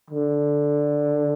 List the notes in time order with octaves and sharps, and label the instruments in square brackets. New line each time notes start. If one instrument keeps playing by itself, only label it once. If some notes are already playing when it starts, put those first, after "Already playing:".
[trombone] D3